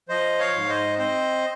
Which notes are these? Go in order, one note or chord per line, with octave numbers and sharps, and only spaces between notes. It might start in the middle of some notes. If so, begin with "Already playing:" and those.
F3 C5 D#5
C#5 F5
G#2
C5 D#5
C4 C5 D#5